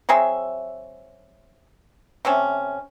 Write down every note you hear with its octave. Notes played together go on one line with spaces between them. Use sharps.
F#3 C4 G#4 E5
C3 A3 C4 C#4